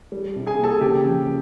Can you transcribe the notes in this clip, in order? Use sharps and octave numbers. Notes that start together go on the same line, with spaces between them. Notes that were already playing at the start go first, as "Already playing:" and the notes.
G3
C3
G#4 G#5
A#3
A4 A5
C#3 G4 G5
F3